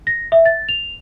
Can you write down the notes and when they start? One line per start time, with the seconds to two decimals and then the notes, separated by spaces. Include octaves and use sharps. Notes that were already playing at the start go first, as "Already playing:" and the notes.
0.07 A#6
0.32 E5
0.45 A6
0.69 F7